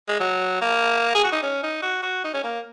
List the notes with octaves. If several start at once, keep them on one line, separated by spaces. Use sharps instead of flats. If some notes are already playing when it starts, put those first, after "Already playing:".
G#3
F#3
A#3
G#4
F#4
D#4
C#4
D#4
F#4
F#4
D#4
C#4
A#3